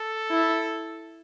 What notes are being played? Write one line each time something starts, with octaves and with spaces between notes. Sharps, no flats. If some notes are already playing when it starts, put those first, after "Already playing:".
Already playing: A4
E4